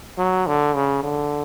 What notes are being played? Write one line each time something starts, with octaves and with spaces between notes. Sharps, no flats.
F#3
D3
C#3
D3